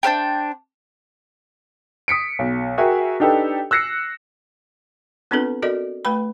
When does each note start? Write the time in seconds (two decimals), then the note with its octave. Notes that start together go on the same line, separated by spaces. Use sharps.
0.03 D4 C5 F5 G5
2.08 D#6 B6 C#7 D7
2.39 B1
2.78 F#4 G#4 A#4 E5 G5 G#5
3.20 D4 D#4 G4 A4 B4
3.71 E6 F#6 A#6 C7 C#7
5.31 B3 C4 D4 F4 A4 B4
5.62 F#4 A4 A#4 D5 D#5
6.05 A3 B4 G5 B5